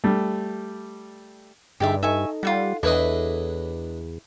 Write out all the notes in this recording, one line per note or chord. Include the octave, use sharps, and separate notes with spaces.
G3 A3
G2 D3 D#4 G4 G#4 D5 E5
D#4 A4 D#5 E5 G#5 C#6
G3 F4 F#4 F#5
E2 D4 E4 A4 B4 C#5 D#5 E5